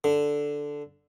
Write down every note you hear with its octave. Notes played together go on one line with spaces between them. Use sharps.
D3